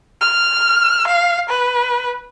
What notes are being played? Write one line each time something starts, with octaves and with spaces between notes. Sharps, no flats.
F6
F5
B4